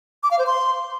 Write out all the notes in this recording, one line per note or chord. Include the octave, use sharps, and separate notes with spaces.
D6
F5
C5
C6